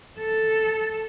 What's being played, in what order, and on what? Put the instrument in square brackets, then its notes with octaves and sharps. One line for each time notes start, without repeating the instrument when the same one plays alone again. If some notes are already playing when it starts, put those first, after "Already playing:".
[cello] A4